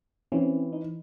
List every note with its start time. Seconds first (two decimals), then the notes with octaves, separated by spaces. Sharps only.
0.32 E3 C4 C#4
0.72 D#4